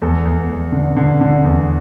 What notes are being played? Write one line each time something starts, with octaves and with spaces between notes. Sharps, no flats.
E2 A4
E2
E2
D3
D3
D3
E2